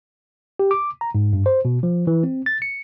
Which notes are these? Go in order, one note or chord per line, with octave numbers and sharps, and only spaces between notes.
G4
D6
A#5
G#2
G2
C5
B2
F3
E3
C4
A6
C#7